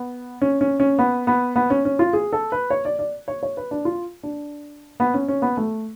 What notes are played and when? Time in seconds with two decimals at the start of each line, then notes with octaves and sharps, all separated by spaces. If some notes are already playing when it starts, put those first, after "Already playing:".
Already playing: B3
0.42 C#4
0.61 C#4
0.80 C#4
0.99 B3
1.27 B3
1.56 B3
1.70 C#4
1.85 C#4
1.99 F4
2.13 G#4
2.33 A4
2.52 B4
2.70 C#5
2.85 D5
2.99 D5
3.28 C#5
3.43 C#5
3.57 B4
3.71 D4
3.85 F4
4.23 D4
5.00 B3
5.14 C#4
5.28 C#4
5.42 B3
5.57 A3